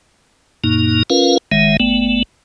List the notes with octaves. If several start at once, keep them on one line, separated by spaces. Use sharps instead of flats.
F#2 A#2 A#3 D#4
C#4 F4 A#4 B4 F5
F#1 D#3 G#3 E5
G1 A3 B3